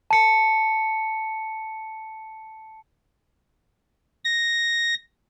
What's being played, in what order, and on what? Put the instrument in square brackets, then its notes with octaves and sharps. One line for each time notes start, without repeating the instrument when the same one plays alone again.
[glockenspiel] A5 C#7
[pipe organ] A#6